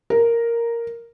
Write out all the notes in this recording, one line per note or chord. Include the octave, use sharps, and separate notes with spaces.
A#4